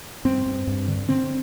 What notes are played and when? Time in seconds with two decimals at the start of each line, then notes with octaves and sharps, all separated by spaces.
0.25 G2 C4
0.46 G2
0.67 G2
0.88 D3
1.09 D3 C4